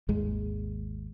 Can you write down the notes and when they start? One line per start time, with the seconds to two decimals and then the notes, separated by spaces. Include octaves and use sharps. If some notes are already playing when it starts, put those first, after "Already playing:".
0.09 G#1 D#2 G#3